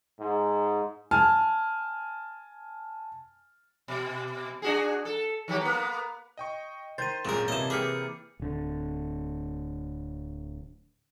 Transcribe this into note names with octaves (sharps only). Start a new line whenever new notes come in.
G#2
G#5 A5 F6
B2
D4 F#4 G#4
A4
D#3 F#3 G4
A#3 B3
D#5 G5 C#6
D#3 C5 C6 G6 A6 D#7
G#1 F#2 A#2 C#3 A#3 A#4
C3 E3 A#3 C#5 D#5 A5
G4 G#4 B4 D6 F6 C#7
D1 D3